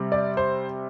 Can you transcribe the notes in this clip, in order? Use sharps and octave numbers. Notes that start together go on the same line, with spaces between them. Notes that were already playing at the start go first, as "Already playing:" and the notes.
Already playing: C3 G3 C4
D5
C5